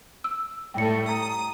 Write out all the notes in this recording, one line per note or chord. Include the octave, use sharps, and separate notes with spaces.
E6
A2 G3 A3 G5 C#7
A#5 D#6